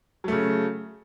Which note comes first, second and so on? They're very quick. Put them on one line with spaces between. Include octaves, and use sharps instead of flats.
F#3 A3 C#3